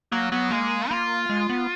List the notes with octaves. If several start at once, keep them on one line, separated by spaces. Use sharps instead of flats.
F#3 A#3
F#3 B3
G#3 A#3
A#3 F4
G#3
B3